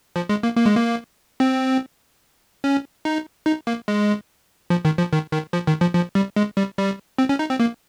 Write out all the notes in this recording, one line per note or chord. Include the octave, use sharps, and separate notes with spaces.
F3
G#3
A#3
A#3
G#3
A#3
C4
C#4
D#4
D#4
A#3
G#3
F3
D#3
F3
D#3
D#3
F3
D#3
F3
F3
G3
G#3
G3
G3
C4
C#4
D#4
C4
A#3